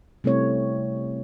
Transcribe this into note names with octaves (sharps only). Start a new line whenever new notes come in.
C3 G3 A3 C4 E4 C#5